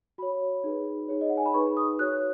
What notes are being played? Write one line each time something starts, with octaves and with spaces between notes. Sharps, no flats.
F#4 C#5 B5
D#4 G#4 B4
D#4 G#4 C#5
D#5
F#5
G#5
B5
D#4 G#4 B4 C#6
D#6
F#4 C#5 F#6